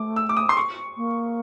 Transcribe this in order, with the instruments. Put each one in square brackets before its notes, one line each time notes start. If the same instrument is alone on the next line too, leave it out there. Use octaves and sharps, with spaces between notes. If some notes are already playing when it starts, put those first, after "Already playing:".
Already playing: [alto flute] A3 [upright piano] D6
[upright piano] E6
D6
D#6
C6
C#6
[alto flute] A#3